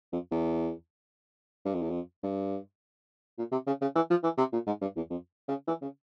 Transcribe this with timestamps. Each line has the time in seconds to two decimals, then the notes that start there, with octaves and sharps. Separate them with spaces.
0.13 F2
0.32 E2
1.65 G2
1.74 F2
1.82 E2
1.90 F2
2.23 G2
3.38 A#2
3.52 C3
3.67 C#3
3.81 C#3
3.95 E3
4.10 F3
4.24 E3
4.38 C3
4.53 A#2
4.67 G#2
4.81 G2
4.96 E2
5.10 F2
5.48 C#3
5.68 E3
5.82 C#3